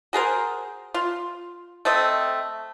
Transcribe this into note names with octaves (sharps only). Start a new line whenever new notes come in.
F#4 G#4 A#4 C5
F4
A3 C4 D#5